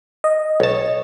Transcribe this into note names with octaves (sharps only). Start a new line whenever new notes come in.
D#5
B1 C#5 A5